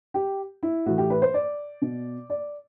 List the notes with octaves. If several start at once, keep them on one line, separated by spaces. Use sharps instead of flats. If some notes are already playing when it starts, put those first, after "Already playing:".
G4
E4
A2 E3 F#4
G4
B4
C5
D5
B2
D5